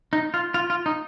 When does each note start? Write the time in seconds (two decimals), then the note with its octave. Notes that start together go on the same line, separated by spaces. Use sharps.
0.13 D#4
0.34 F4
0.54 F4
0.70 F4
0.86 D#4